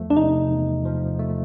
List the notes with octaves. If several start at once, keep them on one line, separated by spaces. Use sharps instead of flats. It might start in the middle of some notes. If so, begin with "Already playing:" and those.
Already playing: E2 F3 A3
D4
C3 D#4
E2
F3
A3